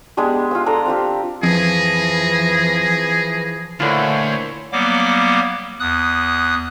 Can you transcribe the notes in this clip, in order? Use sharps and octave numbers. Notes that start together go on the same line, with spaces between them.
G#3 B3 D4 G4
F4 G#5 E6
D4 A4 A#5
C4 F4 G4
F2 E3 F3 G#4 A#6
D2 A#2 D3 E3 E4 F4 C5 C#5
F#3 G3 A#3 B3 D6
E2 D#6 F#6